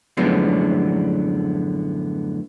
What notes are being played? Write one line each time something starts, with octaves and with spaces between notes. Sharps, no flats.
F#2 A2 D3 F3 G#3 B3